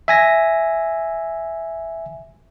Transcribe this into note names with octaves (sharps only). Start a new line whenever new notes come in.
E5 G#5 A#6